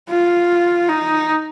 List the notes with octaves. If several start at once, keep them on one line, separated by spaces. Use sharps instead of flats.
F4
D#4